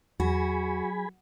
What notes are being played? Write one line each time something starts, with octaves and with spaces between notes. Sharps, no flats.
E2 F#3 F#4 G#4 G#5 B5